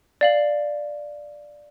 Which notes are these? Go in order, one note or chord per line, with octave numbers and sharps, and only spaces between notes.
D5 F5 F#7